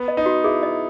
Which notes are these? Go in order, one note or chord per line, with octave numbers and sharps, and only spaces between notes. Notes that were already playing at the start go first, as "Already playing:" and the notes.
Already playing: B3
D#5
D#4
F#4
E4 G#4
D#5